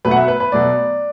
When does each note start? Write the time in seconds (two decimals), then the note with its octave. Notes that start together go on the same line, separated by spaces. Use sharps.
0.05 B2 F#3 A3 B4
0.11 F#5
0.17 E5
0.28 B4
0.40 B4
0.52 B2 F#3 A3 D5